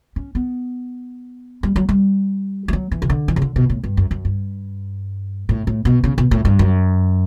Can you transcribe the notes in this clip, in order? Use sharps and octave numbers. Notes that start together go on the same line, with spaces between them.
C#4
B3
G3
F#3
G3
G3
F#3
E3
C#3
D3
E3
C#3
D3
B2
A2
G2
F#2
F#2
G2
A2
A2
B2
C#3
B2
A2
G2
F#2